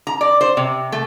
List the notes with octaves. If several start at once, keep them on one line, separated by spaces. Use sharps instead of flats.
A#5
D5
C5
C3
A3